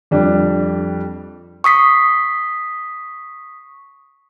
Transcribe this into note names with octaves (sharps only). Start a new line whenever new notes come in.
F2 G3 D4
C#6 D#6 B6 C7